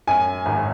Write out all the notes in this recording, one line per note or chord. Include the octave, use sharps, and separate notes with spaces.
F#2 G#5
G#1